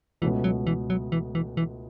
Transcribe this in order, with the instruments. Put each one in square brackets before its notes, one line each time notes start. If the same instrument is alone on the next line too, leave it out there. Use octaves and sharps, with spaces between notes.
[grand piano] C#2 B2 A3 C#4 [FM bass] E3
[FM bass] F#3
E3
F#3
E3
E3
E3